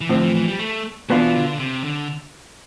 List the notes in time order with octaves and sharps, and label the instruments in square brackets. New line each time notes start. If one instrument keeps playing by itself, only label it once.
[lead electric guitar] E3
[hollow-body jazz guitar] A2 F3 C4 [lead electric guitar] D3
[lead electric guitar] E3
E3
G3
A3
[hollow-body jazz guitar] B2 B3 D4 F4 [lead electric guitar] E3
[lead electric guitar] D3
C3
D3